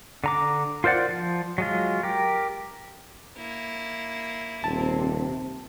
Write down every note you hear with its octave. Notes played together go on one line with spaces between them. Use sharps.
D3 A#5 D6
F4 A#4 C5 D5 F#5
F3
F#3 G#3 F4
G4 A#4
A#3 E4
D#1 C3 A5